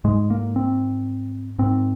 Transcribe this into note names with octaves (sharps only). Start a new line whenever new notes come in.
G#2 G#3
A#3
C4
G#2 C4